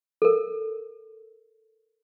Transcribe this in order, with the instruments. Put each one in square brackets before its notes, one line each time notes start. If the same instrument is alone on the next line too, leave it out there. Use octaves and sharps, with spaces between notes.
[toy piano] A4 A#4